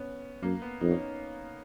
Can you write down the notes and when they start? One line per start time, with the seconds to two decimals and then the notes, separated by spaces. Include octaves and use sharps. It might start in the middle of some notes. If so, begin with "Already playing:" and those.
Already playing: B3 C#4
0.43 F#2 A#3
0.62 B3
0.81 F2 D#4
0.91 C#4